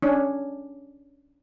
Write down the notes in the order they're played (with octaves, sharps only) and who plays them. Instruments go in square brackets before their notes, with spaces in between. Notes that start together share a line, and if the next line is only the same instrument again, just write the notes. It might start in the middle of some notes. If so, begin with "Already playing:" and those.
[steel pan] C#4 D4